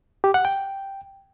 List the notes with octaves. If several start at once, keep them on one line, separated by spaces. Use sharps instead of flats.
G4
F#5
G5